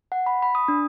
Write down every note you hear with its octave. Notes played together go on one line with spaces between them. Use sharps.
F#5
B5
B5
D#6
D4